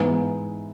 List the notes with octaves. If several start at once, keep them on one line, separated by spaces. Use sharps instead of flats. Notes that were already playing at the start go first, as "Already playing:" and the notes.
Already playing: G#2 E3 B3